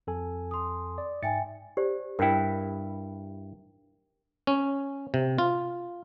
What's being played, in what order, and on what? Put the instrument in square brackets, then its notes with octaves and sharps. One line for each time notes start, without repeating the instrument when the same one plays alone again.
[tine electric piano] F2 A4 G#5
[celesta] C6 D#6
[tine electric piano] D5
[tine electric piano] G#2 A6 C#7 [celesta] E5 G5 G#5
[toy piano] G4 C5 D5
[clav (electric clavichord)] G2 E4 [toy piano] A#4 G5
[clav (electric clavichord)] C#4
C3
F4